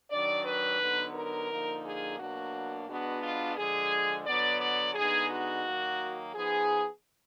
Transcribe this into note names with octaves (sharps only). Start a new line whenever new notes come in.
D#3 F#3 D4 D5
B4
D3 F#3 B3 D#4
A#4
D3 F3 A#3 D#4
G#4
B2 F#3 A#3 D4 F#4
B2 G#3 B3 D4 F#4
F4
D3 F3 G#3 G#4
D3 F#3 B3 D5
D5
D3 G#3 B3 D#4 G#4
F#4
D#3 F#3 A#3
F3 B3 D#4 G#4